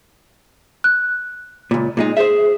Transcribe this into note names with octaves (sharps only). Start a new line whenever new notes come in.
F#6
C#2 A#2
A#2 G#3 D#4
G#4 C5 E5